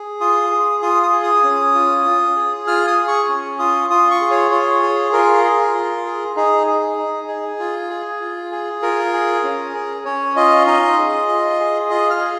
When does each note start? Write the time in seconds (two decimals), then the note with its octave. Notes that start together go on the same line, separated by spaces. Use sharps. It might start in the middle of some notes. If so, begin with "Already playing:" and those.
Already playing: G#4
0.21 F4 D#6
0.51 G#4
0.82 F4 D#6
1.03 D#6
1.13 G#4
1.23 D#6
1.44 C#4
1.75 F4
2.05 F4
2.36 G#4
2.67 F4 F6
2.87 D#6
2.98 G#4
3.08 C#6
3.28 C#4
3.59 F4 D#6
3.90 F4 D#6
4.11 C#6
4.21 G#4
4.31 C#5
4.51 F4 C#5
4.82 G#4
5.13 F4 A#4
5.44 G#4
5.74 F4
6.05 G#4
6.36 D#4 G#4
6.67 G#4
6.98 D#4
7.28 G#4
7.59 F4
7.90 G#4
8.21 F4
8.52 G#4
8.82 F4 A#4
9.14 G#4
9.44 C#4
9.74 G#4
10.05 C#4 C#5
10.36 F4 D#5
10.67 D#4 D#5
10.98 G#4
11.29 F4
11.60 G#4
11.90 F4 D#5
12.10 F6
12.21 G#4